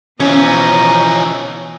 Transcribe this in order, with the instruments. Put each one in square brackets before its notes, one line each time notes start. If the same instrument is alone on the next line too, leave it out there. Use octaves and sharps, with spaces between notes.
[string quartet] B2 D#5 A#5 [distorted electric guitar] E3 F3 [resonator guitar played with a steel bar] C#4